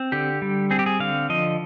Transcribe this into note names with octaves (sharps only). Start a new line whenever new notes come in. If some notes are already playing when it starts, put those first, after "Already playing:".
Already playing: C4
D3 G4
G3
C4 G#4
G4
G#4
D3 F5
F3 D#5